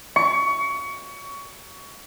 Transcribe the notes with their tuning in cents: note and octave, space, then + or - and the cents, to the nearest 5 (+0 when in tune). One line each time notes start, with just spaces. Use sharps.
C#6 +20